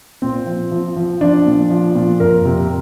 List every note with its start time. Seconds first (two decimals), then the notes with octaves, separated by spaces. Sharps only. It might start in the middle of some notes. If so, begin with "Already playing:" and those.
0.22 A#2 C4
0.46 F3
0.72 F3
0.97 F3
1.21 F3 D4
1.46 A#2
1.70 F3
1.95 A#2
2.20 F2 A#4
2.45 C3